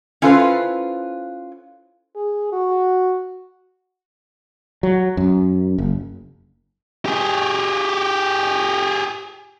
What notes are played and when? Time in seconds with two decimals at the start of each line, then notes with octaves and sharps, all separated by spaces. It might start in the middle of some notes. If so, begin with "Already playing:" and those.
0.22 C#4 E4 F4 A4 B4 C5
2.15 G#4
2.52 F#4
4.83 F#3
5.17 F#2
5.78 F#1
7.06 G4 G#4